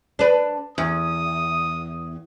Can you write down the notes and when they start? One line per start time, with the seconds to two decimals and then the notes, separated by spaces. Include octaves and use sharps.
0.19 D4 B4
0.78 E2 D#6